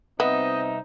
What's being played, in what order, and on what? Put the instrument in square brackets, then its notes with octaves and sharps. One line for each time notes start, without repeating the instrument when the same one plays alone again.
[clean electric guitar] C2 E5 [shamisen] B3 [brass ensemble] C4 D#4 [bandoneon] D#5